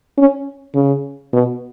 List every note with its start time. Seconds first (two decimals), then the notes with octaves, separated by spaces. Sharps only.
0.18 C#4
0.75 C#3
1.33 B2